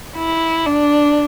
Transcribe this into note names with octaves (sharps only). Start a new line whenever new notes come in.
E4
D4